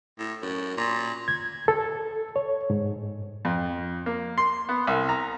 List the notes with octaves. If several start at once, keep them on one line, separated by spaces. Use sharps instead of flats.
A2
F#2
A#2
G#6
A4
C#5
G#2
F2
A#3
C6
B3
C2
A#5